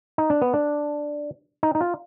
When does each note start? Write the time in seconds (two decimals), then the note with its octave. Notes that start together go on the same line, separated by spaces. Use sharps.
0.18 D#4
0.30 D4
0.42 B3
0.54 D4
1.63 D#4
1.75 D#4
1.81 F4